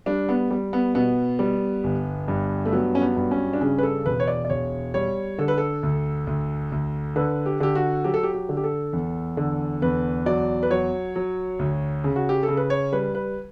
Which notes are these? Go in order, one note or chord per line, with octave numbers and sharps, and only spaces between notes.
G3 D4
B3
G3
B3
B2 B3
G3
G1
G2
A3
F#3 B3
C#4
B3
G2
C#4
D4
C#3 C#4
B4
A4
E1 B4
C#5
D5
D5
E1 C#5
G3 C#5
D3 A4
B4
A4
D2
D2
D2
D3 B4
G4
D3 G4
F#4
F#3 G4
A4
G4
G4
D3
G4
A4
E2
D3
E2 B4
F#3 D5
B4
F#3 C#5
F#3
D2
C#3
F#4
G4
A4
C#3
B4
C#5
G3 B4
B4